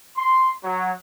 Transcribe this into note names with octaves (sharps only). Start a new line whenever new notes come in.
C6
F#3